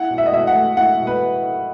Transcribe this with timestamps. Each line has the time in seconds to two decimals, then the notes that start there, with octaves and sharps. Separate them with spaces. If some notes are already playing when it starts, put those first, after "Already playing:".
Already playing: E4 F#5
0.10 B2
0.18 E5
0.26 D#5
0.33 B2 E5
0.47 F#5
0.55 A3
0.77 E4 F#5
1.00 B2
1.07 B4